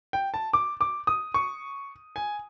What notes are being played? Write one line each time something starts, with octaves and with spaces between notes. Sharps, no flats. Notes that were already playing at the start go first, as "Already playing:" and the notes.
G5
A5
D6
D6
D#6
C#6
G#5